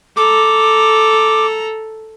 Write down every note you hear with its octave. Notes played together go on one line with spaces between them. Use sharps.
A4 A#5 D6